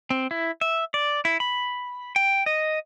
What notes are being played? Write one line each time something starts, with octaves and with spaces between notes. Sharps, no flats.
C4
E4
E5
D5
E4
B5
G5
D#5